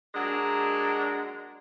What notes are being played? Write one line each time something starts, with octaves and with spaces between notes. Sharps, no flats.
F#3 G#3 A#3 D4